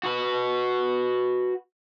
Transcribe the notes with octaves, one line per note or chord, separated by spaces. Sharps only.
F#4 B4